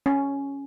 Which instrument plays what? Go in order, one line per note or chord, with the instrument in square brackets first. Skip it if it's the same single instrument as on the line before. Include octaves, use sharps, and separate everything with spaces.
[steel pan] C#4